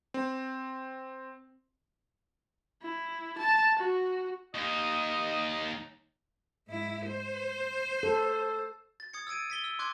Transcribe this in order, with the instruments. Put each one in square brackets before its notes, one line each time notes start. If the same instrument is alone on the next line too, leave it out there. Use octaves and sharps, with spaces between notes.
[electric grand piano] C4
[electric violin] E4
A5
F#4
[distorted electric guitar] D#2 D#4 [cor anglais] D#5
[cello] G#2 E4
C5
[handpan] A4
[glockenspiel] A6
D#6 G#6 A6 C#7
E6 G#6 A6 D7 D#7
A6 B6 G7
E6
C6 D6 F#6 G#6 A6